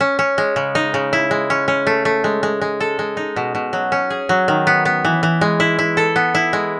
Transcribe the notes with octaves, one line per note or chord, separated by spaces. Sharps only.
C#4
C#4
G#3
C#3
D#4
C#3
E4
G#3
C#4
C#4
A3
A3
G#3
G#3
G#3
A4
G#3
D#4
B2
B2
F#3
C#4
G#4
F#3
D#3
B3
B3
E3
E3
G#3
E4
E4
A4
B3
E4
G#3